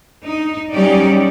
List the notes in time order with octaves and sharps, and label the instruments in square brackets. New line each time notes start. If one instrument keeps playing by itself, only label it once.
[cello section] D#4
F#3 G3 C#4 D#4 G4 D5